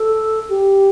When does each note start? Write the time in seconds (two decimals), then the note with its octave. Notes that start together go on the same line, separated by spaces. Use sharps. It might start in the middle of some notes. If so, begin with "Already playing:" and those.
Already playing: A4
0.49 G4